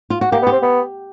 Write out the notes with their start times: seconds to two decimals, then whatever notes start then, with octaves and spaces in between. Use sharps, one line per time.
0.10 F4
0.21 F#4
0.32 A#3 G4
0.43 B3
0.47 G4
0.52 C4
0.62 B3